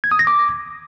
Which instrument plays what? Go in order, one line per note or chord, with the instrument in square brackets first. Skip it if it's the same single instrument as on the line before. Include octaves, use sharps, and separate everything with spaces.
[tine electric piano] G#6
D#6
A#6
D6